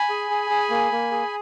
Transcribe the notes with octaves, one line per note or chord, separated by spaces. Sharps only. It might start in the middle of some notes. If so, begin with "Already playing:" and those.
Already playing: G#5 B5
G#4
G#4
G#4
A#3
A#3
G#4